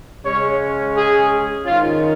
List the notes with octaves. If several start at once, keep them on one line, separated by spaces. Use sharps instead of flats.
C#3 G#3 C#4 C#5
G#4
G#2 D#3 C#4 F4